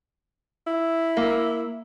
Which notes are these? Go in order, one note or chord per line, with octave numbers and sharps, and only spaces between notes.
E4
A#3